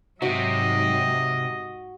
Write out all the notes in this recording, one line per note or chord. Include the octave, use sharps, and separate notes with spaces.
G#2 C3 F#3 F#4 D#5